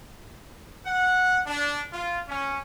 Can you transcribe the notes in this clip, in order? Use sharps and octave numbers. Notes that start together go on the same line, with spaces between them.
F#5
D4
F4
C#4